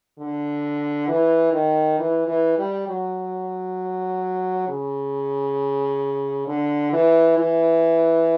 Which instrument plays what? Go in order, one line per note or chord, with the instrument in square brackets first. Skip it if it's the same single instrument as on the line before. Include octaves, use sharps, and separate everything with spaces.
[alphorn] D3
E3
D#3
E3
E3
G3
F#3
C#3
D3
E3
E3